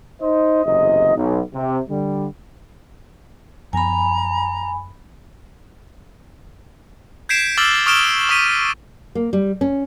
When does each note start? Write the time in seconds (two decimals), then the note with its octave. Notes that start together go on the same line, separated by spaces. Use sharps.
0.21 D#4 C5 D#5
0.65 F#1 E2 C3 D#5
1.16 B1
1.54 C3
1.90 D3 G3
3.73 F#2 F3 B3 G#5 A#5 B5
7.29 G6 G#6 B6 C7 D7 E7
7.58 D6 E6 F6 A6 F#7 G7
7.86 C#6 D#6 F6 D7 E7 G7
8.29 C#6 D#6 B6 D#7
9.15 A#3
9.33 G3
9.61 C#4